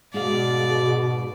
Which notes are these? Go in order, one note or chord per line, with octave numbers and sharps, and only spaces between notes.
G#2 B2 G#4 D5 F5